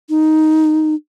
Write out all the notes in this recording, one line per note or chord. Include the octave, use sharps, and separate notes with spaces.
D#4